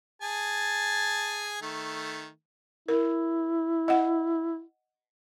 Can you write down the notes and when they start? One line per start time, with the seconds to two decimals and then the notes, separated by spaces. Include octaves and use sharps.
0.22 G#4 G#5 A5
1.62 D#3 A3
2.88 E4 A#4
3.88 D#5 F#5